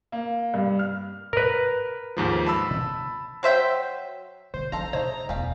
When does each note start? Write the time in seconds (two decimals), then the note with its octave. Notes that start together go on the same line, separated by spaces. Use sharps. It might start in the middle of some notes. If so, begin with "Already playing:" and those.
0.12 A#3
0.54 G2
0.79 F6
1.33 A#4 B4
2.17 D#2 G#2 F3
2.46 A5 B5 E6
3.43 F#3 C5 E5 G5
4.54 D3 C5
4.72 A#1 E4 A4 C5 F5 A#5
4.93 C#3 A3 D#4 C5
5.29 E1 D2 G3 G#4 F5